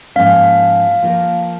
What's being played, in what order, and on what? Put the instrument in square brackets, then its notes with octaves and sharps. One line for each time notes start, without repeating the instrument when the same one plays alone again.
[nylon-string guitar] G#2 F3 A#3 C#4 [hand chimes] F5
[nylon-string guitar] F3 A#3 F4 A#4